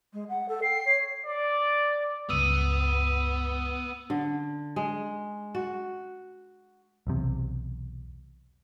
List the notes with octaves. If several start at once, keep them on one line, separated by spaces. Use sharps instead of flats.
G#3
F#5
A4
G5 C7
C#5
D5
C#2 G2 B3 D#6 E6 D#7
D3
G#3
F#4
B1 E2 C3